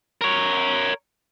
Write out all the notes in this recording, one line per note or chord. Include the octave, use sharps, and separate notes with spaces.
A#4 C#5